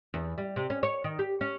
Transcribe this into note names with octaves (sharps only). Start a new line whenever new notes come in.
E2
G3
C3
C#4
C#5
D#3
G4
C#4